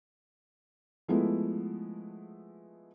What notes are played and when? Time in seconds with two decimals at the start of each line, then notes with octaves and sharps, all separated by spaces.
1.08 F3 G#3 A3 B3 E4